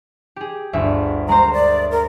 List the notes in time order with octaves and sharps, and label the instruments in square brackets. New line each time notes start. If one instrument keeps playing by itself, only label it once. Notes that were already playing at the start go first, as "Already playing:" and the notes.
[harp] G4 G#4
G1 D2 E5
[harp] G#3 A#4 C5 [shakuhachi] A#5
[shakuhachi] D5
A#4